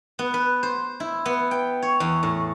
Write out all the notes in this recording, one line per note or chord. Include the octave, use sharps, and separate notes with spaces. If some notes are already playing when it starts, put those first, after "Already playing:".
B3
B4
C5
E4
B3
G5
C#5
E2
A2